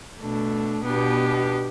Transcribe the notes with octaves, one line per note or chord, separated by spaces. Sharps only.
B2 A3 D4
B2 B3 D4 G4